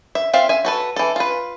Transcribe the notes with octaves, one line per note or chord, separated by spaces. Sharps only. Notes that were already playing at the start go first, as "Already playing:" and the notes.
E5
C4 F4 E5 F5
E5 G#5
F#4 A4 B4
E3 A4
F4 B4